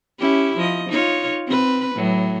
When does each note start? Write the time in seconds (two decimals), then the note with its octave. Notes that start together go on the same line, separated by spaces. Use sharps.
0.19 C#4 E4 G4
0.58 F3 D#5
0.90 D#4 F4 C#5
1.47 C4 B4
1.95 A2 F#3